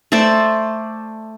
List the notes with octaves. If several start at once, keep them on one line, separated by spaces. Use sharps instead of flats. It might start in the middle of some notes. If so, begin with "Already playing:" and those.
A3 A4 C5 D5